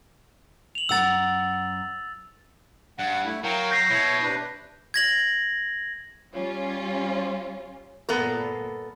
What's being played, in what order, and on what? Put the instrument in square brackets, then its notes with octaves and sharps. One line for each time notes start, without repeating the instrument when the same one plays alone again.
[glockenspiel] F7 F#7
[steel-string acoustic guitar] F#2 F#5 A#5 [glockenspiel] E6 A6
[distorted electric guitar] G2 [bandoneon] F#5
[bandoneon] A3 E4
[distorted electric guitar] F#3 [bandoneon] A#4 F5 G5
[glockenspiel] G6 A#6 C7
[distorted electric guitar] B2 [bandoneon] E4 C#5
[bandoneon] C3 D4 B4
[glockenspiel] G#6 A#6 F#7
[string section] G3 C#4 F4
[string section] G1 A#2 [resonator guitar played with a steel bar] B3 A4 A#4